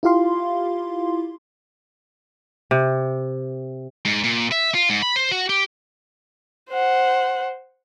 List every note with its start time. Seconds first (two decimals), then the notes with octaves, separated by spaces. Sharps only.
0.03 E4 F4 G4 F5 C6
2.71 C3
4.05 G#2
4.24 A#2
4.52 E5
4.74 F4
4.90 G#2
5.02 B5
5.16 C5
5.31 F#4
5.49 G4
6.69 C5 F#5